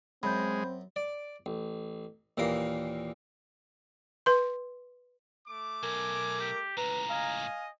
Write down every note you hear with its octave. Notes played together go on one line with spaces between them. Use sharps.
F#2 G#3 C4 B5 G6
D5
A1
D#2 A#2 E3 A#4 F5
B4 C6
A3 D6
B1 A#4 G#5
G4
C#2 A2 B4 A#5
D#5 F5 G#5